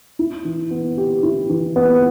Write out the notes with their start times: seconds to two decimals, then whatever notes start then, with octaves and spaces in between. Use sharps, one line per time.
0.19 E4
0.45 E3
0.71 B3
0.98 G4
1.23 E4
1.49 E3
1.76 B3